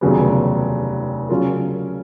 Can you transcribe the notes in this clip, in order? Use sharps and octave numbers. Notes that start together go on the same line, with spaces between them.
F1 D#2 C#3 F#3 B3
C#3 F#3 C#4 F4 A#4